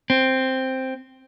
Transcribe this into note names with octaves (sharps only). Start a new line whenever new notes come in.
C4